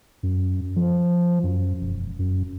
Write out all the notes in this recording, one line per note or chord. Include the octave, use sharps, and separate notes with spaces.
F#2
F3
F#2
E1
F#2